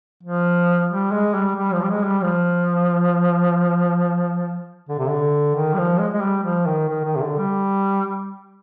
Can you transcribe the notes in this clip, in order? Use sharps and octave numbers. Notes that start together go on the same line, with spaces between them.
F3
G3
G#3
G3
G3
F3
G3
G#3
G3
F3
D3
C3
D3
D#3
G3
F3
G#3
G#3
G3
F3
D#3
D#3
D#3
C3
D3
G3